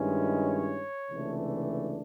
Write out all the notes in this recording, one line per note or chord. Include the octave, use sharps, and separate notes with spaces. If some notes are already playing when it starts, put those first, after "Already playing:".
Already playing: G2 D#3 G#3 C#4 E4
C#5
C#2 C3 E3 A3 D4